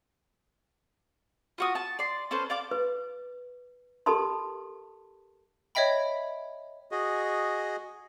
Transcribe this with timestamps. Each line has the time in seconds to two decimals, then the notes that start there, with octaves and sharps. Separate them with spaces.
1.58 F4 F#4 D#6
1.75 A5
1.99 D5 C6
2.31 C#4 A4 B4 C5
2.50 D5 F5 D6
2.71 B4
4.06 G4 A4 A#4 A5 B5 C6
5.75 C#5 D#5 E5 G5 B5
6.91 F#4 G#4 D#5